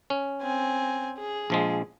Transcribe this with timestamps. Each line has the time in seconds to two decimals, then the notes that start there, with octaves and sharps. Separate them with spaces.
0.10 C#4
0.42 C4 G#5
1.18 G#4
1.50 A#1 F3 G#3